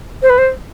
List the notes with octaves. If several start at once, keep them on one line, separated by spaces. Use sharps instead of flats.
C5
B4
C5